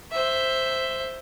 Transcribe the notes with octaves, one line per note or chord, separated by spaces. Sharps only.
C5 E5